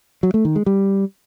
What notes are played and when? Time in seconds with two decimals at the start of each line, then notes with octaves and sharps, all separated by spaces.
0.23 F#3
0.34 A3
0.45 D#3
0.56 G#3
0.66 G3